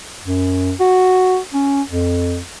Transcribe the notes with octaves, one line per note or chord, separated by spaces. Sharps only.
F#2
F#4
C#4
F2